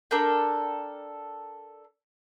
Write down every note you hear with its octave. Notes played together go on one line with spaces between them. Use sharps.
D4 A4 A#4 G5